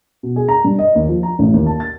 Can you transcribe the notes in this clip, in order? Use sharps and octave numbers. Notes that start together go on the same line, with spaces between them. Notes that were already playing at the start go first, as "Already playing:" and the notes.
B2
G#4
A#5
G2
D#5
D#2
F3
A#5
A1
D#2
A5
A6